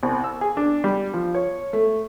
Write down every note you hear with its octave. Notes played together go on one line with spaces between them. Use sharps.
C2
E6
G#4
D4
G3
F3
C#5
A3